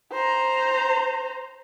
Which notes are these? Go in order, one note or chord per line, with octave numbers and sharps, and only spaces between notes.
C5 A#5